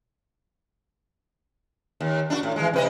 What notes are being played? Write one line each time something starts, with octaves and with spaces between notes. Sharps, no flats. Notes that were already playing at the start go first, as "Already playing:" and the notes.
D#2
D4 E4 F#4
A2
E3 G#3
C3 B4 D#5